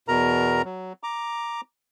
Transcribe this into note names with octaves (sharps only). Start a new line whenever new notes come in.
E2 B2 A#4 A#5
F#3
A#5 D6